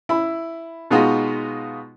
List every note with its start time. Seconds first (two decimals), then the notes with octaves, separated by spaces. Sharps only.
0.09 E4 B5
0.91 B2 G#3 B3 D#4 F4 F#4